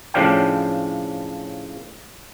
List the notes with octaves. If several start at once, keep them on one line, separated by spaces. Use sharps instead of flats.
A2 C#3 F3 D4 F5 G5